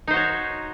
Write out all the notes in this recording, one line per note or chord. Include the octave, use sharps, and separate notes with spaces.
D#4 F#4 C5 C#5